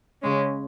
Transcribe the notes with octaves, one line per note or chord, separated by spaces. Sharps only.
C#3 G#3 C#4